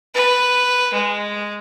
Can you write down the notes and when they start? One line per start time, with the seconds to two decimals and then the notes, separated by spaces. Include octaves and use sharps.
0.15 B4
0.93 G#3